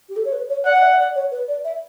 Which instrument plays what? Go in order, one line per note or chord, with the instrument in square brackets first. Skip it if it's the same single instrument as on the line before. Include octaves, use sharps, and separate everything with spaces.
[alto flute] G4
A4
C#5
B4
C#5
[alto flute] D5 [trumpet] F#5
[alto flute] D5
E5
D5
C#5
B4
D5
E5